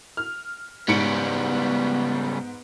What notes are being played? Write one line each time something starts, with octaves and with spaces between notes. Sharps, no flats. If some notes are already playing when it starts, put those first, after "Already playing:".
F6
G#2 C#3 G3 B3 C#7 D7